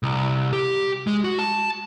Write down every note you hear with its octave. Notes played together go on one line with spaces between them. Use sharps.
C2
G4
G#3
F#4
A5